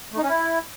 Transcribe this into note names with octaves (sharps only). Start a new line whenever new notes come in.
A3
D#4
C#4
E4